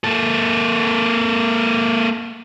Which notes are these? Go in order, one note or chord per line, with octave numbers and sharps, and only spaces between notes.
A#3 A4